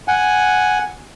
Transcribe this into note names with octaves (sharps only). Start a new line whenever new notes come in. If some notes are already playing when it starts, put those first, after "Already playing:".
F#5 G#5